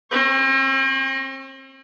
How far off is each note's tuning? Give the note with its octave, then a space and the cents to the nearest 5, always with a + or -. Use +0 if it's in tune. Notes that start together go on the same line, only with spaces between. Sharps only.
C4 +40 C#6 -25